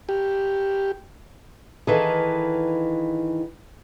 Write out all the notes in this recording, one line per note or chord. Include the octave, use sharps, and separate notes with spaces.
G4
D#3 E3 G#4 A4 B4 F5